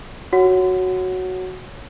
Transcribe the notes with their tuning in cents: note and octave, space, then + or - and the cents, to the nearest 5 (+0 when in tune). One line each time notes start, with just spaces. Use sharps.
F#4 +0 C#5 +0 F#5 +0